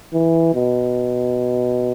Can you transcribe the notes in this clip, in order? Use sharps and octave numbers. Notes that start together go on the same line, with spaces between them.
E3
B2